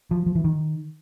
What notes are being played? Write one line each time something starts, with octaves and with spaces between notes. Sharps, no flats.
F3
F3
E3
D#3